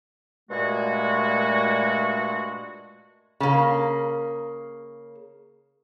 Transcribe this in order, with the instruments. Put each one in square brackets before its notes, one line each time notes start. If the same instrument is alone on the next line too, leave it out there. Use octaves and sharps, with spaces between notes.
[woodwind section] G2 A#2 G#3 A3 F#4
[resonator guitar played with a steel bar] C#3 A#3